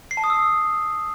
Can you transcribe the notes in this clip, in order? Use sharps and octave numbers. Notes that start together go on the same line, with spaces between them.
C7
A5
D#6
E6